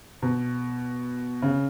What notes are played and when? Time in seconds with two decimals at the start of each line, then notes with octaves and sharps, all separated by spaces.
0.22 B2
1.42 C#3